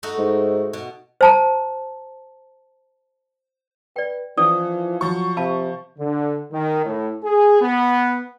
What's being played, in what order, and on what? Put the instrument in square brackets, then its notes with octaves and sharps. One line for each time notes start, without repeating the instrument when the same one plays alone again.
[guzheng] A3 D#4 F#4
[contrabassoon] G#2
[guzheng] B2
[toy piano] C5 A5 A#5
[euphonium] B4 [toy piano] D5 G5
[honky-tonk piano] E3 [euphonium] F3 [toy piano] C#4 D5 D#6
[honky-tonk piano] F3 C#6 [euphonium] F#3
[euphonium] C3 [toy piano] F5 A5 B5
[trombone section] D3
D#3
A2
G#4
B3